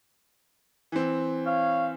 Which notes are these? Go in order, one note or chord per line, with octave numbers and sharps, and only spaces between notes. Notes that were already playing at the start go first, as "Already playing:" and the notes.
E3 C4
C#5 F5